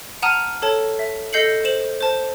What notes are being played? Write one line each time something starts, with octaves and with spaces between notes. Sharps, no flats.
F#5 A5 A#5 D#6 F6 D#7
A4 C#5 A5
E5
A4 D#5 G6 C7 C#7 F#7
C5 E7 F#7
C5 A5